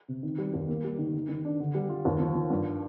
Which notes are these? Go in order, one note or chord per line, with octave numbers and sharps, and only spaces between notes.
C3
D#3
G3
D#2
A#3
G3
D#3
D#3
D#3
D4
D3
G3
F4
D#2
F3
F3
G2